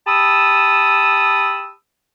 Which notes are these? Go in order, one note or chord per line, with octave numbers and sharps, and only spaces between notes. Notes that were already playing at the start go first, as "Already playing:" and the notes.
G4 A5 B5 D#6 E6